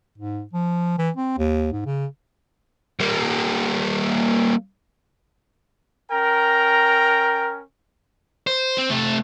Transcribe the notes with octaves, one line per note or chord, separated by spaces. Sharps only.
G#2
F3
E3
C4
D#2
G#2
C#3
G3 A#3
C#4 A#4 G5 A#5
C5
C4
C3 A3